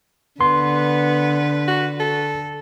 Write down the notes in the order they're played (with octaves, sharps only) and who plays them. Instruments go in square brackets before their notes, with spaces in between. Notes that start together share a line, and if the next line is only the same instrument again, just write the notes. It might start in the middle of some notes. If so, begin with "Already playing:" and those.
[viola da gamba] D3 B4 [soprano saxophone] B3 [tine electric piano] C6
[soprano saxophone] F#4
A4